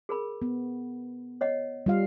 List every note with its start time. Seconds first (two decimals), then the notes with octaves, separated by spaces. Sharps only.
0.09 G#4 A#4 B5
0.42 B3
1.41 C#5 D#5 F#5
1.86 G3 F4 F5